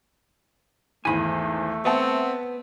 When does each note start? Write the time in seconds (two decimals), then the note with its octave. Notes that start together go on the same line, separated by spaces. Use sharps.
1.05 G#1 E2 A3 G#5 B5
1.85 B3 C4 E5 F#5 A5